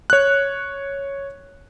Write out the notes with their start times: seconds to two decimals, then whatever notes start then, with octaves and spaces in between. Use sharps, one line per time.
0.10 C#5 F#6